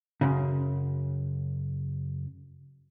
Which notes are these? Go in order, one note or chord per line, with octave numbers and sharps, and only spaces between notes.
F#2 C#3